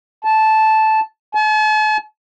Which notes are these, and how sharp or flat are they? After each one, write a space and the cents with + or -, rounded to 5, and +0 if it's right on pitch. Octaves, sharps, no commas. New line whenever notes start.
A5 -10
A5 -45